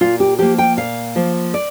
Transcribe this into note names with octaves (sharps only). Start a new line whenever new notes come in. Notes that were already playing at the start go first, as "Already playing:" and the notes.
A#2 F4
G4
F3 A#3 G4
G5
A#2 F5
F3 A#3
D5